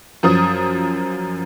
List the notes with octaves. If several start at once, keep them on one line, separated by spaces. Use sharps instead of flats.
F#2 F3 D#6